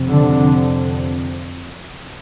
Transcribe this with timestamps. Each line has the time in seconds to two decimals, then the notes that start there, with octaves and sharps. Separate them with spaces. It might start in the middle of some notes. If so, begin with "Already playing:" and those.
Already playing: F2 C3
0.09 D3